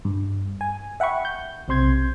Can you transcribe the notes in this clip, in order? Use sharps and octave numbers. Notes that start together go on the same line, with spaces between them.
G2
G#5
E5 F#5 G5 B5 C#6
G6
B1 C3 C4 C6 G6 G#6